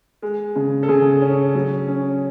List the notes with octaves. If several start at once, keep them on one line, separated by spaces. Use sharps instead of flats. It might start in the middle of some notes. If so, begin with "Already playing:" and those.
G#3
C#3
A4
C#3 G#4
C#4
F#3
C#4